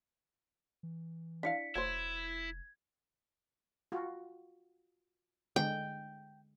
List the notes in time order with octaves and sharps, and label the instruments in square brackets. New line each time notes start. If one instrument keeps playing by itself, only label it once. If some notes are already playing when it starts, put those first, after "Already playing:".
[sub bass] E3
[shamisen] D4 E4 F5 [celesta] B6 C#7
[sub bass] F1 [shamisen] F#3 A3 C5 [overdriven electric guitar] E4 [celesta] G#6
[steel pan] F4 F#4
[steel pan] D3 G#3 [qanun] G5